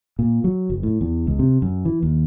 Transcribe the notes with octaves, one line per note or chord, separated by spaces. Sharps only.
A#2
F#3
F#1
A2
E2
C#2
C3
F#2
E3
D#2